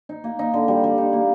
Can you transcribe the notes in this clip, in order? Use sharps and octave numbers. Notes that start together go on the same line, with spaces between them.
D#4
A#3
D#4
D3
G3
G3
D#4
A#3